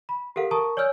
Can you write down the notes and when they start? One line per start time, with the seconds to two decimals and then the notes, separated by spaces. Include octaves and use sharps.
0.09 B5
0.36 G4 A4 A#4 F5 F#5
0.51 A#4 A5 A#5 C#6 D#6
0.77 C#5 D5 G#5 E6 F6 G6